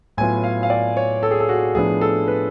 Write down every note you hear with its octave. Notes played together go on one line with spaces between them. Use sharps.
A2 F#3 B3 F4 G#5
F5
F5
D5
C#5
A4
G#4
A4
F#4
A2 F3 B3 D4 G#4
A4
B4